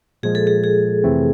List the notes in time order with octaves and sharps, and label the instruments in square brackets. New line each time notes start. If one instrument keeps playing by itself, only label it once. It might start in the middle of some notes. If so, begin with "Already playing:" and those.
[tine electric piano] A#2 F3 G#3 [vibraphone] G#4
[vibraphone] A4
G#4
G#4
[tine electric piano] F2 C3 E3 A3 C4